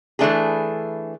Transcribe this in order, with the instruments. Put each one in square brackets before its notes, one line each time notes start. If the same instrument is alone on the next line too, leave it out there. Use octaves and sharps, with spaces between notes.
[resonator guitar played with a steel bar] E3 A3 D4 G#4